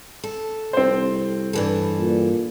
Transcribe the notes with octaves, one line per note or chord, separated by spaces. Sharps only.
A4
C2 C4 C5
G2 E3 A4
A#2